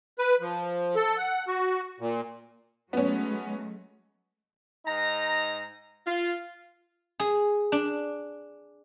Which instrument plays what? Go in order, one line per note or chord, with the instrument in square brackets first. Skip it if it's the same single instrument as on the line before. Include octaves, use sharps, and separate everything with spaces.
[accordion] B4
F3
A4
F#5
F#4
A#2
[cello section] F#3 G#3 A3 [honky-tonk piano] B3 C#4
[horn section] G#2 D#4 A#5
F4
[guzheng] G#4
D4